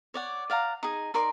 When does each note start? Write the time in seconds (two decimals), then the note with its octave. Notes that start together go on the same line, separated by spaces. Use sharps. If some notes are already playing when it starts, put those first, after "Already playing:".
0.14 C#5 D5 F#5
0.50 D5 F5 F#5 A#5
0.83 D#4 G#4
1.14 D#4 A#4 D5 C6